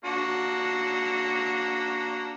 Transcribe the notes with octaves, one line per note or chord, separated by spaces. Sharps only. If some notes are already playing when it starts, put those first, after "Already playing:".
A#3 D4 F#4